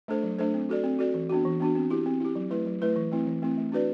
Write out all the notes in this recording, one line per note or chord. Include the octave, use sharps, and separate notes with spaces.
A3 D4 A4 C5
F#3
A3 D4 A4 C5
C4
F#4 A4 D5
C4
F#4 A4 D5
E3
B3 D4 F#4
E3
B3 D4 F#4
C4
E4 G4
C4
E4 G4
F#3
A3 E4 B4
F#3
A3 E4 B4
E3
A3 C4 E4
E3
A3 C4 E4
A3
D4 F#4 B4 D5